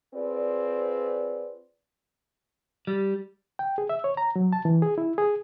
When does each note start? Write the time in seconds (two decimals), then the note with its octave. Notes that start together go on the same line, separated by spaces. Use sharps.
0.14 C4 F4 G#4 B4 D5
2.87 G3
3.59 G5
3.78 G#4
3.89 E5
4.04 C#5
4.17 A#5
4.36 F#3
4.53 A5
4.65 E3
4.82 G#4
4.98 E4
5.18 G#4